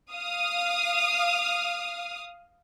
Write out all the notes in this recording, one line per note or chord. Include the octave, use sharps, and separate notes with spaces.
F5 D#6